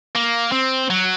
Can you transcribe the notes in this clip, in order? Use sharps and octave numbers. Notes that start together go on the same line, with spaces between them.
A#3
C4
F#3